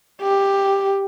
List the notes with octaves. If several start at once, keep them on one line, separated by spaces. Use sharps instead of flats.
G4